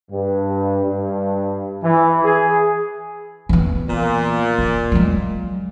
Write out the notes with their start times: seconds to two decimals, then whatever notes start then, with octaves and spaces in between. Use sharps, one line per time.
0.11 G2
0.86 G2
1.83 E3
2.24 G#4
3.49 E3 B3
3.88 A#2
4.58 C4
4.92 F#3 G#3